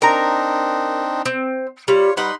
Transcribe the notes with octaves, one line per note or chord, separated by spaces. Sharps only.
C4 D4 D#4 A#4 A#5
C4
G3 F4 C#5
G3 D#4 B4 F#5 B5 C6